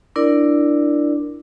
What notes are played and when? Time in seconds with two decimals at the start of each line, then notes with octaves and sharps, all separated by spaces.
0.16 D4 E4 A#4 D5